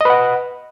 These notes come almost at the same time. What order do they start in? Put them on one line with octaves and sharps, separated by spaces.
D#5 B4 F#5